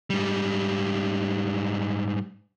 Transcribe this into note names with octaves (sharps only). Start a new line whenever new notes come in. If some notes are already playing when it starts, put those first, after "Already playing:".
G#2 G3